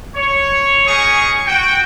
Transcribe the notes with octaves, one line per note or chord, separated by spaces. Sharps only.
C#5
C#4 D#4 G#4 G#5 C#6 D#6
F#4 G5